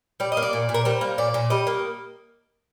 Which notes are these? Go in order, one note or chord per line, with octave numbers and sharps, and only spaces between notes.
G3 D5
D#5
A#3
D5
A#2
A#2
A#4
G3 C5
A#3
A#2 D5
A#2
G3 D#5
A#3